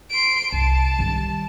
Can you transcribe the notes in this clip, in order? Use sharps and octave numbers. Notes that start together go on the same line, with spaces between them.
C6 D7
C2 A5
D#3 G3